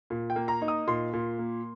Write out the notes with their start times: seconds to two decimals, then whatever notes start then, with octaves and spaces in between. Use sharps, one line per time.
0.10 A#2
0.30 G5
0.36 A#3
0.48 A#5
0.62 D#4
0.68 D#6
0.87 A#2 C6
1.13 A#2
1.39 A#3